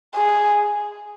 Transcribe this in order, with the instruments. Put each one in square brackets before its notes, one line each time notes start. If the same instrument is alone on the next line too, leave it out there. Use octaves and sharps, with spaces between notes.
[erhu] G#4